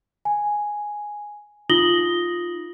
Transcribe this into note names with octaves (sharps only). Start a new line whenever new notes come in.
G#5
D#4 F4 D#6 A#6 F#7 G7